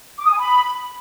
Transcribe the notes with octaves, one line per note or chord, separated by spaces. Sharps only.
D6
D#6
G#5
B5